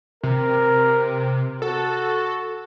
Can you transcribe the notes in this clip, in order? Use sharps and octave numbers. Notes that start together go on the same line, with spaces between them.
C3 A#4
F#4 A4